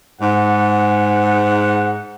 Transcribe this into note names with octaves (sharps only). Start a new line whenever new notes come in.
G#2 F#5